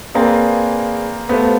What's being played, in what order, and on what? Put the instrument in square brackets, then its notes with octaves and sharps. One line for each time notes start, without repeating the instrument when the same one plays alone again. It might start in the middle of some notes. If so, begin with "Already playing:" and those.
[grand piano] A#3 C4 [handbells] G#4 B4 D5 F5 G#5
[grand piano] A3 B3 [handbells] G4 C5 F5 A5